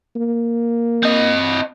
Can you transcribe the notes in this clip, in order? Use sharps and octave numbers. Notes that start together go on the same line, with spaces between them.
A#3
C4 D#5